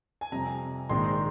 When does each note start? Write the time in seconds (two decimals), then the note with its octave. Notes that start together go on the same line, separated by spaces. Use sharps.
0.21 G#5
0.32 F2 C3 G3 A#5
0.89 A#1 G#2 D#3 G#3 C4 C6